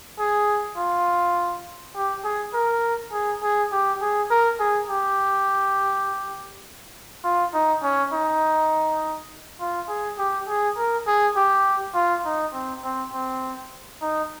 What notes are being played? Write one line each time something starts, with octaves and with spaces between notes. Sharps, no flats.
G#4
F4
G4
G#4
A#4
G#4
G#4
G4
G#4
A#4
G#4
G4
F4
D#4
C#4
D#4
F4
G#4
G4
G#4
A#4
G#4
G4
F4
D#4
C4
C4
C4
D#4